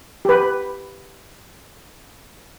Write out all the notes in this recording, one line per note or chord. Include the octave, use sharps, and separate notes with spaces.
G4 B4